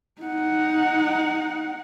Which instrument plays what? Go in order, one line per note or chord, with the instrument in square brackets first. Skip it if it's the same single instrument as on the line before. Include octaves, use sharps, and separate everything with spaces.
[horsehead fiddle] D#4 F#5